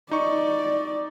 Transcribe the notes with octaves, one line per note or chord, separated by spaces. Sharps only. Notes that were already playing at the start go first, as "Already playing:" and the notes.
D#4 D5 C#6